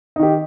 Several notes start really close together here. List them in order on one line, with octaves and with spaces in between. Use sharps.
D#4 D#3 G4